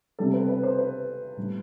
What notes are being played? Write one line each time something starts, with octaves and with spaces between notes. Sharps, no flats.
C3 G3 B3 A4
B4
B4
C5
B4
A2 G3 B3